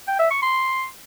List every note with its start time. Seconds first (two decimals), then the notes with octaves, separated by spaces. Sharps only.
0.08 G5
0.19 E5
0.31 C#6
0.42 C6